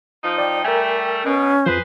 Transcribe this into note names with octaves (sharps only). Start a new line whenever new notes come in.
F3 D#4
D5 G5
G3 A3 A#4 G#5
B2 C#4
F2 F3 G#4 B4 C5